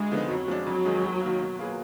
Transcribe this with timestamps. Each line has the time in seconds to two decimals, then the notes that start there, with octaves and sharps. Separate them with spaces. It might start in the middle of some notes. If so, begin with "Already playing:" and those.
Already playing: D2 G#3
0.12 D3 F3 B3 D#4
0.30 F2 F#3
0.48 F3 G#3 D4
0.66 F2 F#3
0.85 D#3 G#3 D#4 G#4
1.03 D#2
1.21 D#3 A#3
1.40 B2
1.59 A#3 F4 G#4 B4